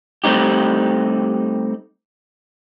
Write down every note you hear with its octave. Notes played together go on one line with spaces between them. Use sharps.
G3 A3 C4 D#4 G4